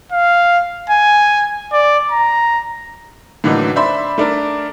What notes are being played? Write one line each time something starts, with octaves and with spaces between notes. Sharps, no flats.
F5
G#5
D5
A#5
A2 D3 E3 F#3 A#3 D#4
D4 C5 E5 B5 C6
A3 D4 A#4